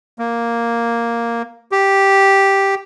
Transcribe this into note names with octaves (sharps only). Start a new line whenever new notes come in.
A#3
G4